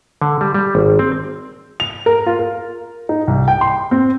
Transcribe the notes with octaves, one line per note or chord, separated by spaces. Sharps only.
D3
G3
G3
G#1
C4
F7
A#4
F4
A#4
D#4
C2
G5
C6
C4